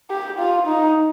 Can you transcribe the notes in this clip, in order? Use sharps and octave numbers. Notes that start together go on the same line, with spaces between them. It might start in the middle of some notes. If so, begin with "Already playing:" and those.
G4
F4
D#4